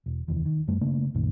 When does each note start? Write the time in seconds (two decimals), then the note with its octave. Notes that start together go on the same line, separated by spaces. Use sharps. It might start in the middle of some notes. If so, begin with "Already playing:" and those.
0.06 E1
0.28 F1 D#2 E3
0.45 D#3
0.68 F#2 G3 A3
0.81 C#3 A3 A#3 D4
1.14 C2 F#2 A#2 D#3